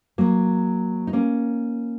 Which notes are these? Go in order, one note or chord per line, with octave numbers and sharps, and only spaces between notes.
F#3 A#3
D#4
A#3 C#4